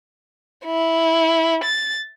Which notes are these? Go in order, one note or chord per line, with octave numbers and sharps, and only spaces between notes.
E4
A6